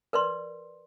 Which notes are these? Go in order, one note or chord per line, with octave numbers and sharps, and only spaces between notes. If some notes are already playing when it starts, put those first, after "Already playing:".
A#4 B4 D5 C6